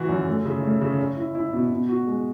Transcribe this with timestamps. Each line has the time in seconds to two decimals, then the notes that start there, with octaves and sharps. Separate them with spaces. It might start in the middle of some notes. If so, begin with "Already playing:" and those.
Already playing: E3 F#4
0.09 F#2
0.27 A3
0.45 C#3
0.63 A3
0.81 C#3
0.99 C#4
1.16 E4
1.35 E4
1.53 B2
1.71 B2
1.89 F#4
2.07 G#3